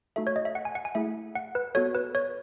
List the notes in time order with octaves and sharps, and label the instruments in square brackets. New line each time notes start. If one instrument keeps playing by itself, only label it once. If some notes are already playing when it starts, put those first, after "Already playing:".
[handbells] A3 D#4 F#4 A4 E5
C#5
D#5
E5
F#5
G#5
F#5
G#5
A3 E4 G#4 E5
F#5
B4
B3 F#4 A4 C#5
B4
C#5